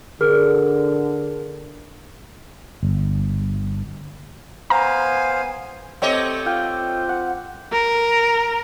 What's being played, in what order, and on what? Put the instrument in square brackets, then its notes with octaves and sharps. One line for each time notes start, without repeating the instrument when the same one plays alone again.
[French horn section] D3 [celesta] G#4 A#4 F6
[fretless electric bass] G1
[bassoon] B3 [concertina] C5 F5 [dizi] G#5 [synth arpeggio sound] A#5
[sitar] A3 C#5 D#5 [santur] C4 G4
[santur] F4 G5
F#5
[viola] A#4